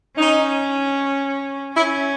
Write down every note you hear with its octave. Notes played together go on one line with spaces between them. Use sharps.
C#4 D#4
C#4 E4